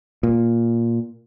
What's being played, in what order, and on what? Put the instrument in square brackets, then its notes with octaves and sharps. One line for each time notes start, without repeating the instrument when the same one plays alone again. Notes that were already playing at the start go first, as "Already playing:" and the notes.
[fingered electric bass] A#2